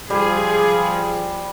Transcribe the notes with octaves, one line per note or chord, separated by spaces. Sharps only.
F3 G3 G#4